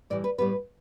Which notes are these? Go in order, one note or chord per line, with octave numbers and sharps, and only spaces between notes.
A2 E3 G3 D5
B4
A2 G3 B3 B4